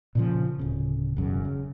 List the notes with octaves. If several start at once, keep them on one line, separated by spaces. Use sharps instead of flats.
A#2 C#3 F3
D1 C#3
E1 F#2 C#3
C#3